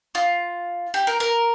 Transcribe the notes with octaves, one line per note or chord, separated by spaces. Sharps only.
F4
G4
A#4
A#4